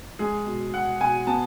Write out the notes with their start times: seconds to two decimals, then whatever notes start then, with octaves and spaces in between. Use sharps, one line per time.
0.19 G#3 G#4
0.46 B2
0.74 B2 F#5
1.01 B2 G#5
1.27 B3 A5